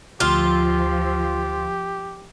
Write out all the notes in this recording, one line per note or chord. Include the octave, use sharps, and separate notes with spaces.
D2 F3 F4 G4 E6